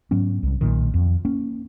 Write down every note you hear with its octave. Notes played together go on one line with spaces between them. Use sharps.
G#2 F#3 B3 C#4
C2
B1 A#2 D#3
F2
A#3 C#4